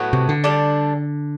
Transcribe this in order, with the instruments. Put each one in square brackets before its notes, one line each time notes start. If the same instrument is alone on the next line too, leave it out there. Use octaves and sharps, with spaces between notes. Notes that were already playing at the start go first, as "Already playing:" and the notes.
Already playing: [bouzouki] A2 F#3 B3 F#4
[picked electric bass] C3
D3
[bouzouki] G3 D4 A4